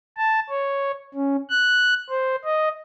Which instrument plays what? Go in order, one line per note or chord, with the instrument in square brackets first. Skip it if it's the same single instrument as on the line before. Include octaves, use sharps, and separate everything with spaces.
[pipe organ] A5
C#5
C#4
F#6
C5
D#5